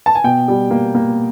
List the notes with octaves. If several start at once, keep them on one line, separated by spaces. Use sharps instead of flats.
A5
G#5
B2 G5
G3
A#3
A#3